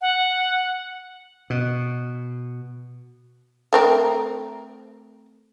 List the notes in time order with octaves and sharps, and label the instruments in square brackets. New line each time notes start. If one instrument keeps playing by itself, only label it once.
[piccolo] F#5
[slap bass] B2
[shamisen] A3 C4 A#4